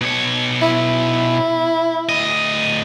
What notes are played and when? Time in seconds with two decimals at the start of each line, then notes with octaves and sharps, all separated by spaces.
0.01 B2 C#5
0.62 E4
2.09 D2 D#5